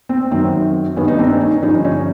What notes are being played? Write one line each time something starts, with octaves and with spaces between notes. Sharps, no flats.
C4
F#2 D#3 C4
G2 D#3 B3 C#4
D#4
C4 D4
C#4 D#4
G2 D3 F3 C#4 D#4
C#4 D#4